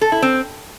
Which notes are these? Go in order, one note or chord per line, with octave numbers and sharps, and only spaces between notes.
A4
E4
C4